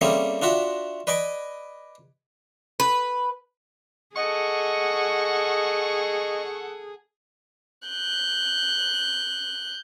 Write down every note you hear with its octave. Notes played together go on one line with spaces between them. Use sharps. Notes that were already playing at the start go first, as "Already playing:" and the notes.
G3 A3 A#3 C4 C#4 G#4
D4 F4 F#4 E5
B4 D5 D#5 G#5 B5 D6
B4
G#4 A4 D#5 F#5 C#6
F#6 G6